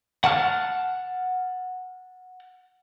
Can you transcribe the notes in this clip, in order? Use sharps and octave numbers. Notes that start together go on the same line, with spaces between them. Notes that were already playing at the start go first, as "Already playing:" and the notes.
F#5 A5 F6